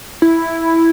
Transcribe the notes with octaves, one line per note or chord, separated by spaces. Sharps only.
E4